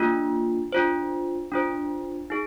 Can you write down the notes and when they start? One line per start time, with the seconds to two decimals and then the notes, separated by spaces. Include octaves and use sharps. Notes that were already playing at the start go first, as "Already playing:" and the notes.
Already playing: A#3 D4 F4
0.72 D4 F4 C5
1.52 D4 F4 C5
2.30 D#4 G#4